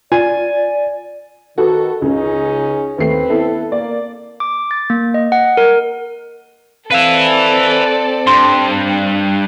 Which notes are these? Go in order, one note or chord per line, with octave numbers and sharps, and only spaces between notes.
F4 D5 G#5
D#3 F#4 A4 B4
C#2 C#3 C#4 D#4 G#4
D#2 A3 C4 B4 C7
B3 E4 A4
A#3 D5
D6
A6
A#3
D#5
F#5
A#4
C4 A4 B4 D5 E5 F5 D#7
G2 C6